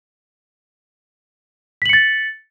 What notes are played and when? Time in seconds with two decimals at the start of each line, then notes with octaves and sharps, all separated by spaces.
1.82 B6
1.86 F#7
1.89 C#7
1.93 A6